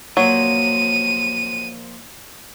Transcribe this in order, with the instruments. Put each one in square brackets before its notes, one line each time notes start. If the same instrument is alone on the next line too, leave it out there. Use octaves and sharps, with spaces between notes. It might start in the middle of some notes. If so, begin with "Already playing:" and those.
[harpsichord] A#2 F3 [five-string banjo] F#3 [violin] D#7